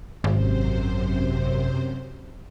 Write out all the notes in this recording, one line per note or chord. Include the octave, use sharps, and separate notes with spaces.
G#1 F#2 C3 C5